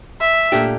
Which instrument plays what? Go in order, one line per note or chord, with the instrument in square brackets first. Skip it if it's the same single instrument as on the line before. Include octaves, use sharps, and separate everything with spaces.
[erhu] E5
[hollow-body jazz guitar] A#2 A3 D4 G4